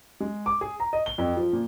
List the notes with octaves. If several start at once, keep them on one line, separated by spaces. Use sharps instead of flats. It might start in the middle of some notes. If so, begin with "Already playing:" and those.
G#3
D6
G#4
A#5
D#5
G7
F2
F3
A#2